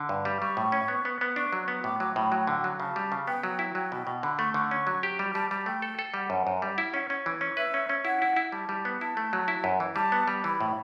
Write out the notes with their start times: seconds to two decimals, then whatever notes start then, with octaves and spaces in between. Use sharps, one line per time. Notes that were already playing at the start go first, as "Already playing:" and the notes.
Already playing: D3
0.09 G2
0.25 G3
0.41 G3 C#6
0.57 A2
0.72 C#4
0.88 B3
1.05 B3
1.21 B3
1.36 D4 C#6
1.53 F#3
1.68 B3
1.84 A2 D6
2.00 F#3 D6
2.16 A2 B5
2.32 F#3 G5
2.47 D3
2.64 F#3
2.80 C#3 A5
2.96 G3
3.12 C#3
3.27 B3 G5
3.43 F#3
3.59 E4
3.75 F#3 G5
3.92 B2
4.07 B2
4.23 D3 B5
4.38 A3 C#6
4.54 D3 C#6
4.71 C#4 C#6
4.87 F#3
5.03 G4
5.19 G3
5.34 G3 A5
5.51 G3 A5
5.66 A3 G5
5.82 A4
5.99 A4
6.14 G3 F#5
6.30 F#2
6.47 F#2
6.62 G3
6.78 E4
6.94 C#4
7.10 C#4
7.26 E3
7.41 C#4
7.57 B4 E5
7.74 C#4
7.89 C#4
8.05 E4 F#5
8.22 E4
8.36 E4
8.52 G3 A5
8.69 G3
8.85 B3
9.01 E4 A5
9.17 A3
9.33 F#3
9.48 E4
9.64 F#2
9.80 E3
9.96 G3 A5
10.12 B3
10.28 G3
10.44 E3 B5
10.61 A2